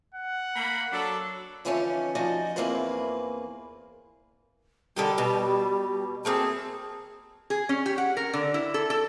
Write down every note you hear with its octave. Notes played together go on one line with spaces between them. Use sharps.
F#5
A#3 B5
F#3 D4 A4
D3 E3 F3 C#4 D#4 C#5
F3 D#4 F#4 D5 D#5 G#5
E2 E3 A#3 C4 G#4 B4
D3 D#3 G3 G4
B2
A3 A#3 C4 G#4
G#4
C#4
G4
F#5
A#4
D3
E4
A4
A4